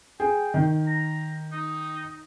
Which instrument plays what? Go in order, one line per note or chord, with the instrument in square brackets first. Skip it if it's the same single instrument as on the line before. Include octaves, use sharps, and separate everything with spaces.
[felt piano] G#4 [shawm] G5
[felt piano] D#3
[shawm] A#5
D#4